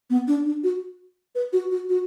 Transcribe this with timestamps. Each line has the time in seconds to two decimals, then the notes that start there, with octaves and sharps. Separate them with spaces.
0.10 B3
0.28 D4
0.46 D4
0.64 F#4
1.35 B4
1.53 F#4
1.71 F#4
1.89 F#4